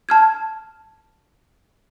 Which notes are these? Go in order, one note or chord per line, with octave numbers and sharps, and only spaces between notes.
A5 F6 G#6